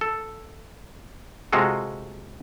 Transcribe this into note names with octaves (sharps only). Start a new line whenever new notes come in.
A4
C3 G#3 F4 F#4 A4